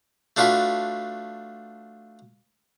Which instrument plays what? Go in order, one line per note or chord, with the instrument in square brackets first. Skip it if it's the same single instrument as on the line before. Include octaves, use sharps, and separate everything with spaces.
[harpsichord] A3 D4 F4 F#4 B4